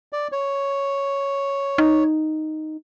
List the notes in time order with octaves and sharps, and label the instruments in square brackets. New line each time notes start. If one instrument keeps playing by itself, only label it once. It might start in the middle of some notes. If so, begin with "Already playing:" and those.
[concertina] D5
C#5
[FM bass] D#4